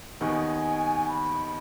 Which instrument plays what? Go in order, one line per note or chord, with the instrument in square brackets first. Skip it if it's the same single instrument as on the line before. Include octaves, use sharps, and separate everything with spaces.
[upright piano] D#2 D#3 B3 D#4 [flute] G#5
[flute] B5